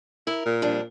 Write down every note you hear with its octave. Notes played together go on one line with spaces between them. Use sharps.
E4 A#4
A#2
F2 G3 D4